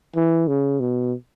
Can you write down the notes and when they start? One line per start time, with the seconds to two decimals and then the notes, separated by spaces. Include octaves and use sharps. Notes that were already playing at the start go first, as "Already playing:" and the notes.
0.16 E3
0.48 C#3
0.80 B2